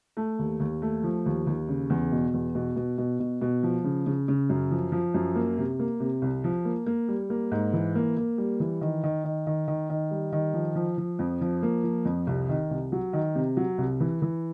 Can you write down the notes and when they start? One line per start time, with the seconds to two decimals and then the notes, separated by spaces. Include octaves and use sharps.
0.17 A3
0.39 D#2
0.60 D#2
0.82 A3
1.03 F3
1.26 D#2
1.47 D#2
1.69 C#3
1.90 E2
2.12 B2
2.34 E2
2.55 B2
2.76 B2
2.98 B2
3.20 B2
3.41 B2
3.63 F3
3.84 C#3
4.07 C#3
4.28 C#3
4.50 F#2
4.71 F3
4.92 F3
5.14 F#2
5.35 A#3
5.58 C3
5.79 A#3
6.00 C3
6.22 C2
6.44 F3
6.65 A#3
6.86 A#3
7.08 G3
7.30 A#3
7.51 G#2
7.73 E3
7.95 A#3
8.17 A#3
8.38 G3
8.60 E3
8.81 D#3
9.04 D#3
9.24 D#3
9.47 D#3
9.68 D#3
9.90 D#3
10.11 G3
10.33 D#3
10.54 F3
10.75 F3
10.98 F3
11.19 F2
11.41 F3
11.63 A#3
11.84 F3
12.05 F2
12.27 C2
12.49 D#3
12.70 C2
12.92 F#3
13.13 D#3
13.35 C3
13.57 F#3
13.78 C2
14.00 E3
14.22 E3